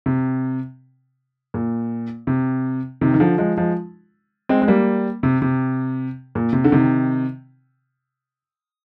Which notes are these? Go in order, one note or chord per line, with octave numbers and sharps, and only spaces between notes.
C3
A#2
C3
C3 D#3
D#3
D3 F3
F3 G#3
F3 G#3
G#3 C4
G#3
G3 A#3
C3
C3
A#2
C3
D3
C3 D#3